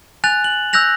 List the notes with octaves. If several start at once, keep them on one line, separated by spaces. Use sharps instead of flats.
G#5 F#6 A6 F7
F#7
E6 F#6 G6 A#6 F7